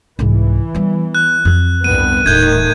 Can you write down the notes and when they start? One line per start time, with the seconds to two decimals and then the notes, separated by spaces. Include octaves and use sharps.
0.19 C2 G#2 E3
0.75 G3 B3
1.15 F#6
1.45 F2 C4
1.84 C2 G2 B3 D#7
2.26 D#1 A2 D#3 A3 D#4 G6 G#6